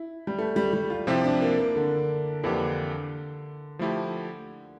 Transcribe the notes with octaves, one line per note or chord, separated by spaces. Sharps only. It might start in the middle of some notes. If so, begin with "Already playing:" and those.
Already playing: E4
G3
A3
G3
G3
F4
C3 F3 C4 E4 G4
D4
A#3
A#3
D3
F2 D3 E3 A#3 D4 G4
F3 A3 E4 G4